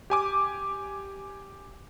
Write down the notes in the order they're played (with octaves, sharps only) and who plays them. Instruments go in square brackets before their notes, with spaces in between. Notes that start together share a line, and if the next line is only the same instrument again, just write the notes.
[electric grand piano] G4 G#5 D6